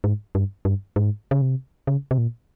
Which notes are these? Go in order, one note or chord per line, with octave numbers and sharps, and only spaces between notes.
G#2
G2
G2
G#2
C#3
C3
C#3
C3
A#2